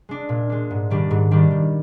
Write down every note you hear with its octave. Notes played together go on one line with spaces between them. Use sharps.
G#3 D4
A#2
G#3 D4
G#2
D#3 G3 D4
G#2
D#3 G3 D4
D#3